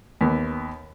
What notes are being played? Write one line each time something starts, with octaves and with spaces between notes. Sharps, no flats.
D#2 B3